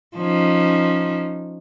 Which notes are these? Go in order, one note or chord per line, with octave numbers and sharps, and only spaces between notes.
F3 C#4 D#4